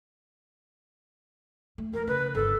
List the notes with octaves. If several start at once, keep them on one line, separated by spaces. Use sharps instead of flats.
A3
F2 A#4
C#3 B4
G1 D3 A4